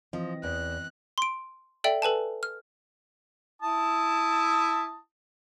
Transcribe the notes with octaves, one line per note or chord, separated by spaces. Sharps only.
E3 F3 C4 D#5
E2 F#6
C6 D7
A4 D5 E5 G5
A4 B4 G#5 A5
F6
E4 A5 D#6